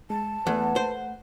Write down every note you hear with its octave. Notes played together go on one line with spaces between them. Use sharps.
G#3 A5
E2 A3 B4 F#5
C5